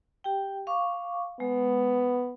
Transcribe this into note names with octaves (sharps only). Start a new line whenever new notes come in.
G4 G5
F5 C#6 D6
G#3 B3